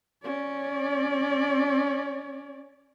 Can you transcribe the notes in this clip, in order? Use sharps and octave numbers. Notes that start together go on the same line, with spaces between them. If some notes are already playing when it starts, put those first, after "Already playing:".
C#4 D5